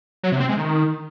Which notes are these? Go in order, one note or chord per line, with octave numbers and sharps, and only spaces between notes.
F#3
C3
C4
G#3
D#3